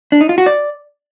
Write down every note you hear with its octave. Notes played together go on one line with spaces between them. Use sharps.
D4
D#4
F4
F#4
D5